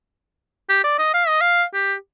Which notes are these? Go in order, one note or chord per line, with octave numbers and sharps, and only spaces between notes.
G4
D5
D#5
F5
D#5
F5
G4